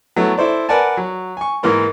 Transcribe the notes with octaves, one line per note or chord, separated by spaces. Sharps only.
F#3 A3 B3 E4
E4 A4 C5 D5
A#4 B4 D5 F#5 G#5 A5
F#3
G#5 C#6
G#2 E3 A#3 A#4 C6